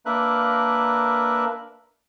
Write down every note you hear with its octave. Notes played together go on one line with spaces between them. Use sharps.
A#3 D4 A#4 B4 E5 F#6